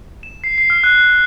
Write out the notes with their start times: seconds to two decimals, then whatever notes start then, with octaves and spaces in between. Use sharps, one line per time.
0.23 E7
0.44 C7
0.58 C7
0.70 F6
0.84 F#6